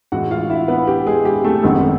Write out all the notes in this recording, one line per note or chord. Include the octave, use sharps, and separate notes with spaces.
A2 E3 G#3 F#4 F#5
F4 F5
E4 E5
B3 B4
G4
G#3 G#4
G4
A3 A4
G#1 F#2 D#3 G#3 B3